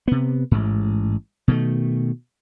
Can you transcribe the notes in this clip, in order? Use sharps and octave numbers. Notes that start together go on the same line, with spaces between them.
C3 B3
A1 G#2
B2 D#3 A3